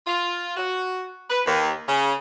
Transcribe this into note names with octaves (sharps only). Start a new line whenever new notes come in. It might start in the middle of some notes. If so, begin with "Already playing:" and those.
F4
F#4
B4
D#2
C#3